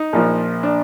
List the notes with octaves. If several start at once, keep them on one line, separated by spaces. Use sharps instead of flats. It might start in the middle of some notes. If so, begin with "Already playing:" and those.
Already playing: D#4
A#1 A#2 F3
D4